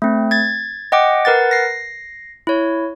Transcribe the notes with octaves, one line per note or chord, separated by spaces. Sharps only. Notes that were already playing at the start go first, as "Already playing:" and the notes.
A3 C4
G#6 A6
D#5 F#5 G5 D6
A#4 B4 F#5 A6
A#6 C7
E4 C#5